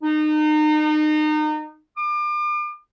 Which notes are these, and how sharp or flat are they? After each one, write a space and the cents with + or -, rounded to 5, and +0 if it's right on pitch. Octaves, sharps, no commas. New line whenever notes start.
D#4 -30
D6 +40